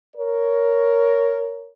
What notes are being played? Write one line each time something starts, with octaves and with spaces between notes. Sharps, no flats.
A#4 C#5